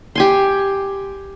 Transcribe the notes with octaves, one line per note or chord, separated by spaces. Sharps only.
G4 G#5 C6